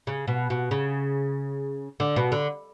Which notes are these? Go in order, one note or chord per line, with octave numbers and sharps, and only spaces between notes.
C#3
B2
B2
C#3
D3
B2
D3